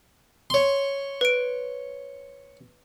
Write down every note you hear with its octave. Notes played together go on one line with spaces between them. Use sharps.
C#5 C6
B4 D7